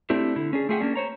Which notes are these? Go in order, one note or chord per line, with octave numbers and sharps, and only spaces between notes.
A3 C4 D4 E4 G4
D3 E4
C#4 D4 G#4
A3 F4 G#4 E5 F#5 G5
A#3 C#4 D4
C5 C#5 A#5